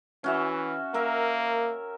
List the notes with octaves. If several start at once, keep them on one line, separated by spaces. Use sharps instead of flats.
E3 C#4 F#4 E5
A#3 A#4 E5